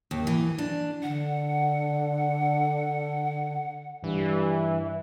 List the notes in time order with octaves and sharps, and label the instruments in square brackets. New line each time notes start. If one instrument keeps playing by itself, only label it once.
[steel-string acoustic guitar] D#2
E3
D4
[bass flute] D3 [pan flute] F#5
[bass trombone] G2 [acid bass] E3